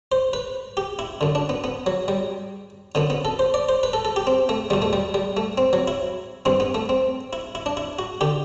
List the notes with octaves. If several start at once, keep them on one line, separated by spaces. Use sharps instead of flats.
C5
B4
G4
E4
F#2 D3
D4
B3
B3
F#3
G3
F#2 D3 B3
B3
A4
C5
D5
C5
B4
A4
A4
G4
C4
A3
E2 B2 G3
A3
G3
G3
A3
C4
F#3
E4
G2 E3 C4
B3
A3
C4
E4
E4
D4
E4
F#4
D3 G4